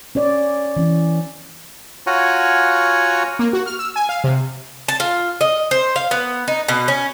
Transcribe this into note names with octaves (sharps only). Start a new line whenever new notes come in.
C#4 C#5 D5
E3 C#4
F4 F#4 C#5 F#5 G#5 A#5
A#3
F#4
F6
E6
G#5
F5
C3
A5
F4
D#5
C5
F5
B3
D#4
B2
C#4